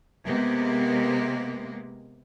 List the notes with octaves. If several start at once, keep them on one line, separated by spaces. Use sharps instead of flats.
C3 G#3 A#3 B3